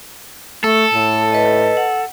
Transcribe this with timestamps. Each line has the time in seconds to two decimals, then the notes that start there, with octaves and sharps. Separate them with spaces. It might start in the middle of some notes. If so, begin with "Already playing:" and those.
0.64 A3 A4 E6
0.93 A2
1.32 B4 D#5
1.77 F#5